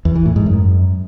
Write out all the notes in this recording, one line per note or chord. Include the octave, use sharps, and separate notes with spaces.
E2
E3
A2
G#2
F#2